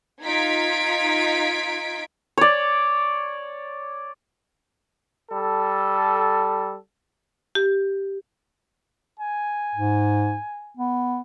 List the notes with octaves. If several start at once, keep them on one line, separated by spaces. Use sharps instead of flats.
D#4 F4 G#6 B6 D7
C#5 D5
G3 A4
G4
G#5
G#2
B3